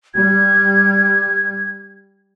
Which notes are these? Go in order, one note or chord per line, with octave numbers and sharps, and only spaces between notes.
G3 G#6